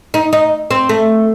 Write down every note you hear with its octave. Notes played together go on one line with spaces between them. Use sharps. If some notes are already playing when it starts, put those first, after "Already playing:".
D#4
D#4
C4
A3